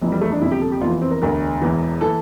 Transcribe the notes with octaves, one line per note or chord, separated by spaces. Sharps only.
F1 F2 E3
G3
A3
D4
G1 F2 C3 E4
G4
A4
G4
F1 E2 E3 F4
C4
A#4
E1 D2 D3 A#4
E1 E2 E3
E3 A4